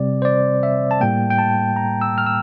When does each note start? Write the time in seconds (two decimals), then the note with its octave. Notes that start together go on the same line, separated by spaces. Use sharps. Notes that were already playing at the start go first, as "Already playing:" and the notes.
Already playing: C3 G3 C4 D5
0.22 C5
0.25 D5
0.63 E5
0.91 A5
1.01 A2 G3 A#3 G5
1.30 G5
1.38 A5
1.76 A#5
2.02 E6
2.18 F6
2.26 E6